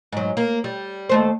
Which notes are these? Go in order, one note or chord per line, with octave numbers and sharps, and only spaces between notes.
G#2 F#3
A#3
G3
D#2 A3 C5